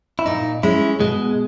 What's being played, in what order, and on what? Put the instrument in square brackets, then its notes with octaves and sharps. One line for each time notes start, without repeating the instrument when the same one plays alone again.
[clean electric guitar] E4
[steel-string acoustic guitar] A#2 [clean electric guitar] D#4
[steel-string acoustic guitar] G#3 C#4 [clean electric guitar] E4
[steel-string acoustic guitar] B2 [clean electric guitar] G#3